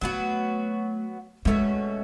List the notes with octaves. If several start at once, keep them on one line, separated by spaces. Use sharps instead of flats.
F#3 A3 B3 F#4
B2 G#3 A3 C#4 F#4